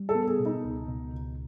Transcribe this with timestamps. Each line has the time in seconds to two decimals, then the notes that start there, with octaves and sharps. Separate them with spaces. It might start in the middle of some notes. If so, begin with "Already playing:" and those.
Already playing: G3
0.09 A4
0.15 B3
0.27 G#4
0.40 B2
0.46 D#4
0.64 C#2
0.88 B2
1.14 C#2